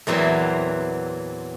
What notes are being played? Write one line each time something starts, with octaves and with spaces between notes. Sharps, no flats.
E2 A#2 E3 F#3 B3 C4